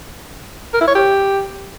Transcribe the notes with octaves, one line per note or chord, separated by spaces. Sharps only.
A#4
E4
C#5
G4